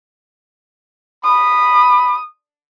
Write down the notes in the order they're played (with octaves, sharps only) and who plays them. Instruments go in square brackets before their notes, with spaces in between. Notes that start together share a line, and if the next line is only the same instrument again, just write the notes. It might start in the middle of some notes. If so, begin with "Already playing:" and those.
[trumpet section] B5 [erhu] D#6